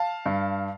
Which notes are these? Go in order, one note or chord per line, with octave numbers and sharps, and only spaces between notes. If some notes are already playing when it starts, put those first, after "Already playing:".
Already playing: F5 A5
G2